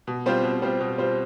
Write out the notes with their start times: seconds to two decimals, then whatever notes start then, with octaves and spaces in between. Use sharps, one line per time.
0.07 B2
0.26 G3 C4 F4 C5
0.43 B2
0.62 G3 C4 F4 C5
0.80 B2
0.98 G3 C4 F4 C5